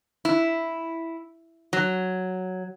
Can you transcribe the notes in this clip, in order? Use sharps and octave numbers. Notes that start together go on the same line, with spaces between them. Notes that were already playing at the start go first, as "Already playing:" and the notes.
E4
F#3